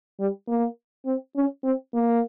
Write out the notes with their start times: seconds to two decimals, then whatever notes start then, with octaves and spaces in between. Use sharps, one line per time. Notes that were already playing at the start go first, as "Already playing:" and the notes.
0.20 G3
0.48 A#3
1.06 C4
1.36 C#4
1.64 C4
1.94 A#3